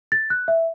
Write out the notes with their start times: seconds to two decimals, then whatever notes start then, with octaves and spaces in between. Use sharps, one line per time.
0.12 A6
0.30 F#6
0.48 E5